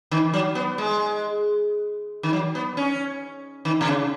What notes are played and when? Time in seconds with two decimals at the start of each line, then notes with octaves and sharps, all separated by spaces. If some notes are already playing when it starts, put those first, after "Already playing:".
0.11 D#3
0.33 F#3
0.55 B3
0.78 G#3
2.23 D#3
2.33 F#3
2.55 B3
2.77 C#4
3.65 D#3
3.81 B2
3.88 C#3